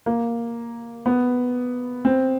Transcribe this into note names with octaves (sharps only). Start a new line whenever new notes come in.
A#3
B3
C4